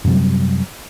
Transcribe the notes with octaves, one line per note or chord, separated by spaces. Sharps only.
F#2 C3 F#3 G3